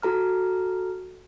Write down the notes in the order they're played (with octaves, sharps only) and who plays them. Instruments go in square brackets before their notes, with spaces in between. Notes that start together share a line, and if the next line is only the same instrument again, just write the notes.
[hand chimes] F#4 A4 A#5 F6